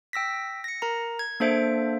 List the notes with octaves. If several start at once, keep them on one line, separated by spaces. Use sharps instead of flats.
G5 E6 A#6 B6
A#6 C#7
A#4 A#5
G#6
A#3 D4 A4 C5 E5 D7